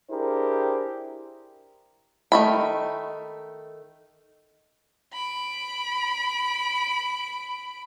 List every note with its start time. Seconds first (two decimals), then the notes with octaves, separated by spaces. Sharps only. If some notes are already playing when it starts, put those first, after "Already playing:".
0.10 D4 E4 G4 G#4 A#4 C5
2.32 D#3 A3 B5
5.13 B5 D7